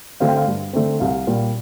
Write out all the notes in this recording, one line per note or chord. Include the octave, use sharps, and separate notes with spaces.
D3 A3 C4 F5
G5
F5
G2
D3 A3 C4
C2 F5
A#2 G3